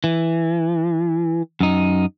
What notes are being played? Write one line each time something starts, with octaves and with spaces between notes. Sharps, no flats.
E3
F#2 D#4